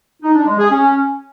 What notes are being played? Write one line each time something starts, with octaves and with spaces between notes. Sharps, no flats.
D#4
D4
G#3
G#4
C#4